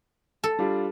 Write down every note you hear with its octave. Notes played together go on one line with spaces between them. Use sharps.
A4
G3 D4 F4